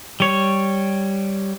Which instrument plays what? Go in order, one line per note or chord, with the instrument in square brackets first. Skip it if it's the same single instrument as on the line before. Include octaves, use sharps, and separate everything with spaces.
[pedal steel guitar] G3 C#5